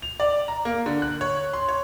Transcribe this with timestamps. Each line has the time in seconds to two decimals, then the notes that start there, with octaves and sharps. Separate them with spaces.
0.02 F7
0.20 D5
0.48 A#5
0.65 A#3
0.86 D3
1.02 F#6
1.21 C#5
1.53 C6
1.69 C#5